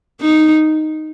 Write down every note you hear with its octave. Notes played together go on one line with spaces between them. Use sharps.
D#4